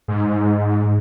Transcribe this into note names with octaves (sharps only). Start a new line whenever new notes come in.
G#2